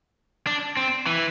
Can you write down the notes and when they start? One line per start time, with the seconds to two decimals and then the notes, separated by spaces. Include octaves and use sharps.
0.47 D4
0.77 C4
1.07 E3